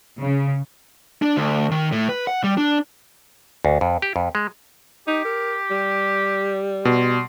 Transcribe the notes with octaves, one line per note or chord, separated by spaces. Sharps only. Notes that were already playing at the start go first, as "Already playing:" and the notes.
C#3
D4
D2
D#3
A2
B4
F#5
G3
D4
D2
F2
G4
F2
G#3
D#4 G4
A#4
G3
B2 C6